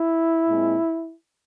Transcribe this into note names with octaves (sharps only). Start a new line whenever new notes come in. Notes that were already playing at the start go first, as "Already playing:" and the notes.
Already playing: E4
A#2 G#3 C4